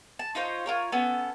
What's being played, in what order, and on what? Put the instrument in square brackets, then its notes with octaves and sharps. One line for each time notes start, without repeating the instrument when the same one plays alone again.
[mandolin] A5
D#4 F4 C5 C#5
F4 A#4 C#5
B3 C#4 A4